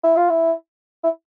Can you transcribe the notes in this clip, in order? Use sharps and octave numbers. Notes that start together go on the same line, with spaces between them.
E4
F4
E4
E4